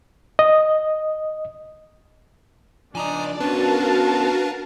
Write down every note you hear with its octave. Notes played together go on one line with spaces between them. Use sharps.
D#5
F3 D4 D#4 D5 G#5 A#5 D#6
B3 C#4 D4 F#4 A#4 B4 F5 A5